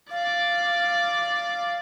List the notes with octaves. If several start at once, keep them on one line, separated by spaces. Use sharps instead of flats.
D5 F5 D6